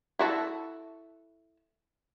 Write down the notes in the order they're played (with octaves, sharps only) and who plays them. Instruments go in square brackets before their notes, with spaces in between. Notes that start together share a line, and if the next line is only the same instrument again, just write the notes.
[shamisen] E4 F#4 A4